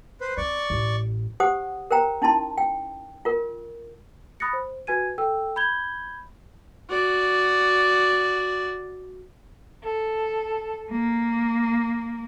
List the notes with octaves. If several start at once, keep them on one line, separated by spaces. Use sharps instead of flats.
B4 C5
C4 D5 C#6
A1
G4 C5 F#5 D#6
A#4 C5 G5 A#5
C#4 D#4 E4 A5 C6
G5
F4 A#4
B5 D#6 F#6 A6 A#6 C#7
C5
F#4 B4 G#5 G#6 D#7
A4 G5 E6
B5 G6 G#6 G7
F#4 D5
A4
A#3